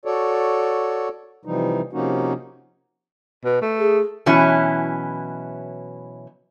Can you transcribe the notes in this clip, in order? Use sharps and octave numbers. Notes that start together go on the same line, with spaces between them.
F#4 A4 C#5 D5
C3 E3 F3 G3 D#4
C3 F3 A#3 C#4 D#4 F#4
B2
A3
G#4
B2 E3 F#3 C#4 E4